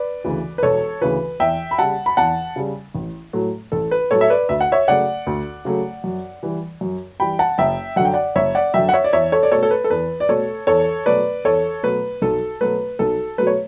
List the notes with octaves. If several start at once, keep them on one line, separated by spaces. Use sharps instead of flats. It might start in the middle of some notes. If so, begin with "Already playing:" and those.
Already playing: B4 D5
D2 C#3 E3
B4
E1 A4 C#5
D2 C#3 E3 B4
E2 E5 G5
B5
C#3 G3 F#5 A5
B5
E2 F#5 A5
C#3 G3
A1
A2 F#3 A3
A1 A4
B4
A2 F#3 A3 A4 C#5
E5
B4 D5
D2 E5
F#5
C#5 E5
C#3 F#3 A3 D5 F#5
D2
C#3 F#3 A3
F#2
E3 G3
F#2
E3 G3 G5 B5
F#5 A5
F#1 E5 G5
F#2 D3 F#5
G5
D5 F#5
F#1 C#5 E5
D5 F#5
F#2 D3 E5 G5
F#5
C#5 E5
D5
E2 C#5 E5
A4 C#5
D5
B2 A3 A4 C#5
A4
B4
A4
E2 B4
D5
B2 A3 A4 C#5
E2 A4 C#5
B2 F#3 A3 B4 D5
E2 A4 C#5
B2 F#3 A3 B4
B1 A4
B2 F#3 A3 B4
B1 A4
B2 F#3 A3 B4
C#5